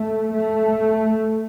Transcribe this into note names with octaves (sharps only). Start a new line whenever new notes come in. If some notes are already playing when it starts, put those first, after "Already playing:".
Already playing: A3
A3